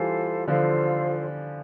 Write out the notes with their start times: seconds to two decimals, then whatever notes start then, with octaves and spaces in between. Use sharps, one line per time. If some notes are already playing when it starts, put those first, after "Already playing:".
Already playing: E3 G3 F4 A4 C5 F5
0.48 D3 F3 F4 A4 C5 F5